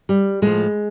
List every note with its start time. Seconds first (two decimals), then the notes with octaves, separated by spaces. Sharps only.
0.09 G3
0.42 A2 F3 G#3